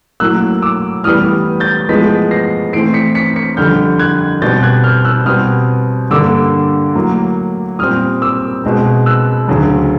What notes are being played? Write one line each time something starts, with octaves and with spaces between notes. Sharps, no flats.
A2 F#3 A#3 E6 F#6
D6 E6
A2 E3 G3 B3 D#6 F6
G6 A6
A2 F3 G#3 B3 A6 B6
A#6 C7
A2 E3 A3 C4 C7 D7
B6 C#7
B6 C#7
B6 C#7
F2 D3 G3 F6 G6
F#6 G#6
B2 G3 C4 G6 A6
F#6 G#6
F6 G6
E6 F#6
B2 G3 C4 D#6 F6
G2 D3 G3 A#3 D6 E6
A2 F#3 A#3
A#2 G3 C4 D#6 F6
D6 E6
B2 G#3 C4
E6 F#6
D2 C#3 F#3